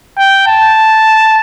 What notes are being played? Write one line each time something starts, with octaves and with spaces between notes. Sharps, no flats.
G5
A5